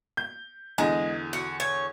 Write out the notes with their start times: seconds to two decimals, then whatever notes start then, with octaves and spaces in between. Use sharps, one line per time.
0.17 G6
0.78 E2 D3 G#3 G#5
1.33 F#4
1.60 C#5